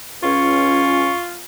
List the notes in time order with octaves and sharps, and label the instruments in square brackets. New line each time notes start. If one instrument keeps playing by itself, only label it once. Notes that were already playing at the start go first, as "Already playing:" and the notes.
[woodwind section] C#2 C#4 [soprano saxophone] F4 [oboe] C#6